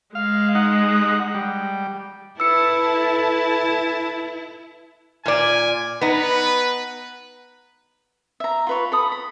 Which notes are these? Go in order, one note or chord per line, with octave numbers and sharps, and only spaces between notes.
G#3 F5
D#4 F#5
G3
E4 A4 B4 A5 E6 C#7
A#2 D5 G#5
B3 D#4 B4
E5 A#5
F4 B4 C#5
A4 B5 D#6
B5